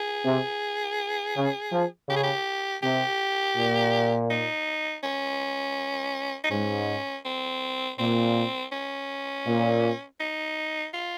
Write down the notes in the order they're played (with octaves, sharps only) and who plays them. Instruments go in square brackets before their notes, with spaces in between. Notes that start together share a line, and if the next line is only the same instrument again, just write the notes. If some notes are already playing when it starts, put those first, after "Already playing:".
Already playing: [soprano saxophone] G#4
[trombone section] C3
C#3
F3
[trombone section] C#3 [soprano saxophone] G4
[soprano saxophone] G#4
G4
[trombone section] C3 [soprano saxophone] G4
[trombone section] A#2
[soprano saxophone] D#4
C#4
D#4
[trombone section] G#2 [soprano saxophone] C#4
[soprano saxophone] C4
[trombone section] A#2 [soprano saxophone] C4
[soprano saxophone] C#4
[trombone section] A#2
[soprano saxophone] D#4
F4